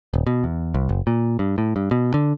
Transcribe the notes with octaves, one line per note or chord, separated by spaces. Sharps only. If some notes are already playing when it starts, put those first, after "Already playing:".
D#1
B2
E2
C2
F#1
A#2
G2
A2
G2
B2
D3